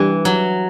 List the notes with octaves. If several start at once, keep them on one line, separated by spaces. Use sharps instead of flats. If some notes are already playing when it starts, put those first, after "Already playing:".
Already playing: E3 G3 D4 G4 B4
F#3